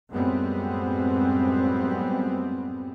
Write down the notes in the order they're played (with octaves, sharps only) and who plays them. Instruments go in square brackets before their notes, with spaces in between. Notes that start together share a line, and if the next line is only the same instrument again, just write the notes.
[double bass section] F#2 A2 G3 G#3 B3 C4